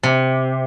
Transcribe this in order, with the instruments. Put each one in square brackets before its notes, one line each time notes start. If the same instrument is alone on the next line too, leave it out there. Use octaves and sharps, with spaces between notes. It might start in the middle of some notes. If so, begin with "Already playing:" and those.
[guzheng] C3